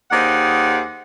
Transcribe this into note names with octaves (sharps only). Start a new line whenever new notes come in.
D#2 D#3 G#4 C5 D5 F#5